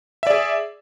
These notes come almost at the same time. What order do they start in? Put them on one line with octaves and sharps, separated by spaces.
E5 D5 G#4